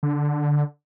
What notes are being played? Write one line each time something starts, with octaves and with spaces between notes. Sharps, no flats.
D3